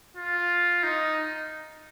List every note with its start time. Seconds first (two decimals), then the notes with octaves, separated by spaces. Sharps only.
0.17 F4
0.83 D#4